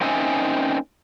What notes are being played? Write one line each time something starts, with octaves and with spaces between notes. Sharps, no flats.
A#3 C4 C#4 D#4 E5 G#5